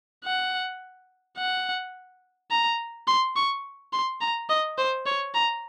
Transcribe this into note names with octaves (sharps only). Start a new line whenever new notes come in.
F#5
F#5
A#5
C6
C#6
C6
A#5
D#5
C5
C#5
A#5